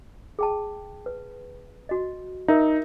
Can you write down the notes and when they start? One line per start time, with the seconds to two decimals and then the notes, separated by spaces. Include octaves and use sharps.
0.39 G#4 G5 A5
1.06 B4
1.89 F#4 D#5
2.48 D#4 A#4 E5